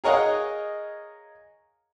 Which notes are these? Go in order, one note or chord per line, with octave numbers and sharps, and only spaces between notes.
G#4 A#4 C#5 D#5 F5 F#5